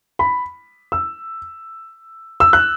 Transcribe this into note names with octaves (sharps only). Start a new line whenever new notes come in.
B5
E6
E6
F#6